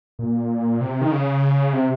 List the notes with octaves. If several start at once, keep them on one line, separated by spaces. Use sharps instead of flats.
A#2
C3
D#3
C#3
C3